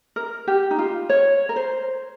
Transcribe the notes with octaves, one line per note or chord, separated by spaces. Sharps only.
A#4
G4
D#4
F4
C#5
A#4
C5